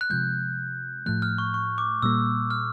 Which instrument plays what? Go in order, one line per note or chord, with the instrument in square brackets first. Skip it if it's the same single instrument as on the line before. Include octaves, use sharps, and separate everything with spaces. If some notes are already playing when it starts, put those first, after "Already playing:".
[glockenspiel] F#6
[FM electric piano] C3 F3 G#3 [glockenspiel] G6
[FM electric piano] A2 F3 A3 [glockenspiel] F#6
[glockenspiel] F6
C#6
C#6
D6
[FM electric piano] A#2 G3 A#3 [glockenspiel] E6
[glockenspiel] F6